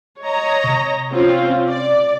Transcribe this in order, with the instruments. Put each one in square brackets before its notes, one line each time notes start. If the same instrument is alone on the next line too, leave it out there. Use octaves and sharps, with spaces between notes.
[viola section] C#5 D#5 A#5
[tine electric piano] C3
[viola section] C4 C#4 F4
D5